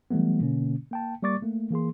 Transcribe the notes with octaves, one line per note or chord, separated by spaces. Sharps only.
E3 F#3 G3 A3 B3
B2 D3 A#3 C#4
A#3 G5 A5
G3 A#3 D5 C#6 D6 A6
A3 A#3
E3 A#3 G#4 C6